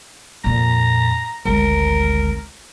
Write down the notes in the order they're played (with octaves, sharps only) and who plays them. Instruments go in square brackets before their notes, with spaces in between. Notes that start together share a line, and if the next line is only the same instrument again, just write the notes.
[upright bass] F2 A#2 [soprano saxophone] A#5
[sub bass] G#1 [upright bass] D2 G#3 [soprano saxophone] A#4